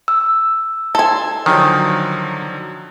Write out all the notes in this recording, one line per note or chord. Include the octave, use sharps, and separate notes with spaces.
E6
A4 G#5 A5 C6
D3 D#3 F3 F#3